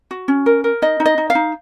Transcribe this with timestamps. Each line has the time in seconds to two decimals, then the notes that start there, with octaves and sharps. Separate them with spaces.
0.11 F#4
0.28 C#4
0.46 A#4
0.64 A#4
0.82 D#4 D#5
1.00 D#4
1.06 D#5
1.18 D#4
1.30 F5
1.35 D#4